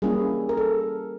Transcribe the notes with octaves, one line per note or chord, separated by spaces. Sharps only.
G3 A#3 C#4 E4 G#4
A#4
A4